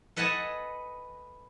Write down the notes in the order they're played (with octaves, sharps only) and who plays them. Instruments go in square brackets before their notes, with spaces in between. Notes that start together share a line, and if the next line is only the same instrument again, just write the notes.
[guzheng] A4 B4 D#5 F#5 G#5 A5